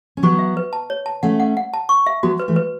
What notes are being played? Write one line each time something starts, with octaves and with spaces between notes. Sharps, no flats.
C#4
F#3 B3 C#6
E5
B4
A5
C#5
A5
A3 C#4 F#5
F#5
F#5
A5
C#6
E5
F#3 B3 F#4
B4
E3 A3
B4